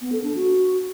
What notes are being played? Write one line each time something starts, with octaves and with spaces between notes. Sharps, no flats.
B3
A4
D4
F#4